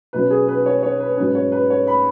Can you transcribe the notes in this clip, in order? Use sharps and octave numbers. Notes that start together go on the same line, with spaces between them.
B2 F#3 C#4 B4
G#4
B4
C#5
C#5
B4
G#2 F#3 C#4 B4
C#5
B4
C#5
B5